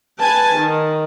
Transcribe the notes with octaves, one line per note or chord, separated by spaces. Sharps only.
B4 G#5 A5
D#3